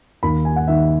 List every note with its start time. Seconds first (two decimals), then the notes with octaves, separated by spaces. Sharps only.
0.23 D#2 D#3 B5
0.45 G#5
0.56 F#5
0.67 D#2 D#3 E5